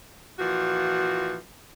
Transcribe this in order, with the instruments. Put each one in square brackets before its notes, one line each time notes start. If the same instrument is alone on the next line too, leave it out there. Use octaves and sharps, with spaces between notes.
[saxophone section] A#2 E3 F3 F#4